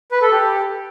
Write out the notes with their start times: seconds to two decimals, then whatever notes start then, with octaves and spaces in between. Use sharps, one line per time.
0.12 B4
0.22 A4
0.32 G4